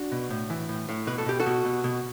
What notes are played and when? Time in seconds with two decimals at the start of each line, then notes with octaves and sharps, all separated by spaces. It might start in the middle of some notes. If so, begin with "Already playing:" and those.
Already playing: D4 F#4
0.12 B2
0.31 A2
0.50 E3
0.69 A2
0.89 A2
1.07 B2 B4
1.18 A4
1.26 B2 G4
1.40 F#4 A4
1.46 B2
1.65 B2
1.84 B2